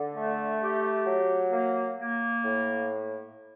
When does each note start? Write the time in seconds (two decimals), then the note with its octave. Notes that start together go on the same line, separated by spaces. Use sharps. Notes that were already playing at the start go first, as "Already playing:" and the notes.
Already playing: D3
0.15 A3
0.61 G4
1.06 F#3
1.51 A#3
1.97 A#3
2.43 A2